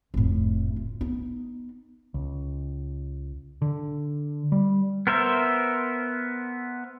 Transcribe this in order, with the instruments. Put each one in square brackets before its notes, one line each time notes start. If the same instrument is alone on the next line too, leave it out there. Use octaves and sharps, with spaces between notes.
[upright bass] F1 A2
F4
B3 D#4
[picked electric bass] C#2
D3
G3
[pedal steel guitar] B3 A#4 C5 E5